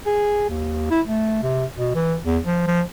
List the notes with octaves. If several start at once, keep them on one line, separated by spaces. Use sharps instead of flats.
G#4
D#2
E4
A3
C3
B2
E3
E2
F3
F3